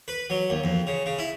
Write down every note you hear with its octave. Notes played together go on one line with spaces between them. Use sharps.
B4
F#3
D#2
F2
C#3
C#3
E4